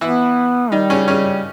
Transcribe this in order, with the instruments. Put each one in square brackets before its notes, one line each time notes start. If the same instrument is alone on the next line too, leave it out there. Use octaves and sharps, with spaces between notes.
[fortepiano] E3 E4 [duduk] B3
[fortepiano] D#3 D#4 [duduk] G3
[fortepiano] C#3 C#4
C#3 C#4